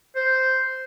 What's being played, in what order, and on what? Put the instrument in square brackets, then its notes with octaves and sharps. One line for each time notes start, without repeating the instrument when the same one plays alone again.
[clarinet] C5